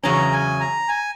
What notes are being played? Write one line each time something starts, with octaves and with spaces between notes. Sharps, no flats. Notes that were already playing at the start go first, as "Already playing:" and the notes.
E2 C#3 F#3 C#4 A#5
G#5
A#5
G#5